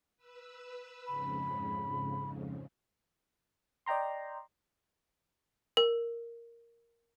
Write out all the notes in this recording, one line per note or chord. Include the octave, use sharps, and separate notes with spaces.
B4 E6
F2 G#2 C#3 B5
D5 D#5 G5 A#5 C6
A#4